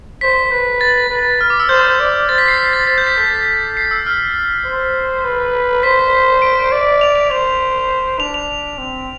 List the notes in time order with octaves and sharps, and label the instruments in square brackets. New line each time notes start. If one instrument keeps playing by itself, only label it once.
[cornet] C5 [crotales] B6
[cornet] B4
[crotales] A6
[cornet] B4
[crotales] F6
D6
E6
[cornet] C5 [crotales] G6
[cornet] D5
[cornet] C5 [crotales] A6
[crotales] B6
C7
B6
A6
[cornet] C5 [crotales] A6
[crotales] G6
B6
[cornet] A4 [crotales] B6
[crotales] C7
E6
F6
[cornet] C5
B4
[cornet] C5 [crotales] B6
[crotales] D7
[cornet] D5
[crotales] F7
F7
[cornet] C5 [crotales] F7
[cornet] D4 [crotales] F7
[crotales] F7
[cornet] C4